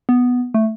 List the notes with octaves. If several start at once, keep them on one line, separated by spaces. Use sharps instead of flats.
B3
A3